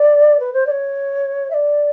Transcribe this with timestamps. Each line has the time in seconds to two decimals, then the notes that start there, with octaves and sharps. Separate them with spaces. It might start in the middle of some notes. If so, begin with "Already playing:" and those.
Already playing: D5
0.40 B4
0.53 C5
0.67 D5
0.71 C#5
1.50 E5
1.54 D5